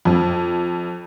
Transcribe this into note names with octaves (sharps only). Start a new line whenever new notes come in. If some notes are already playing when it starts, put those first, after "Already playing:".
F2